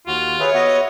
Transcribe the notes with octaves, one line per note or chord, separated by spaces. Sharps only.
D#2 F4 F#4
G#4 B4 C#5 E5
B3 F#4 D#5 E5